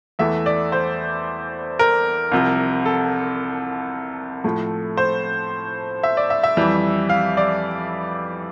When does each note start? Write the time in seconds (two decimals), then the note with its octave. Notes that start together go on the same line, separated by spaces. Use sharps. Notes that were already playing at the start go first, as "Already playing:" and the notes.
0.19 E2 E3 A3 E5
0.46 D5
0.72 C5
1.79 A#4
2.32 C2 C3 F3
2.85 A4
4.44 A2 F3 A3
4.97 C5
6.03 E5
6.17 D5
6.30 E5
6.43 E5
6.57 F2 E3 G3
7.09 F5
7.37 D5